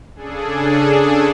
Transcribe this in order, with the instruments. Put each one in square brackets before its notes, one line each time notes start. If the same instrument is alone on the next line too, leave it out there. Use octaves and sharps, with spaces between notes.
[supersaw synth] C#3 D4 G#4 A4